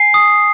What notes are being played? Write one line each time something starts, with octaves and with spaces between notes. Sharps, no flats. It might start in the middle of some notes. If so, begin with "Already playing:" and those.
Already playing: G#5 C7
D#6